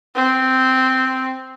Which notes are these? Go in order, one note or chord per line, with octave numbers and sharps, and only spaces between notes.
C4